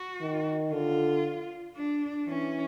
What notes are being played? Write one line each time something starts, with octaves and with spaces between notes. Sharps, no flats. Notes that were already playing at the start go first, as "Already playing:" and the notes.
Already playing: F#4
D#3
D3 F4
D4
E3 C#4